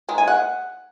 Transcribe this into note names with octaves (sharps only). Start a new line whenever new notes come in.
D#3 G#3
G#5
F#5